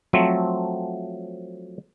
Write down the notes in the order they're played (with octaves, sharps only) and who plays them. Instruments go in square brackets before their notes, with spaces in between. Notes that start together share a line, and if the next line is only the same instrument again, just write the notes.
[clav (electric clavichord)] F3 F#3 A3 C4